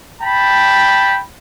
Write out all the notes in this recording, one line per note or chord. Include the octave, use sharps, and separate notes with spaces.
G5 A5 B5